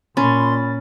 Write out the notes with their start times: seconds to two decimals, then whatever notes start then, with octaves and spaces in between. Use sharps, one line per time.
0.17 A#2 C#4 B5 C6 A6